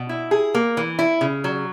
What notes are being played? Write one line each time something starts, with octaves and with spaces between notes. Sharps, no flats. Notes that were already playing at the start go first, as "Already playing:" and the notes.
Already playing: B2
E4
G#4
A#3
E3
E4
C#3
F#3